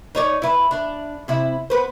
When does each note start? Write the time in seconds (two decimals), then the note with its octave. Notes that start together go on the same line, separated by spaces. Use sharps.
0.15 D#4 C#5 D5
0.42 E4 B4
0.71 D4
1.28 C3 E4
1.70 B3 B4 C5